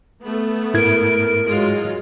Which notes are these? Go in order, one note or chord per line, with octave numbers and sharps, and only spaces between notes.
A3 B3
G#2 E4 A#4 G#6
F#3 G#3 F4